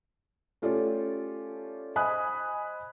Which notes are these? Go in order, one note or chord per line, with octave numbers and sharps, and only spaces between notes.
A3 C#4 F4 G4 A4 D5
C5 D#5 G#5 B5 D#6 F#6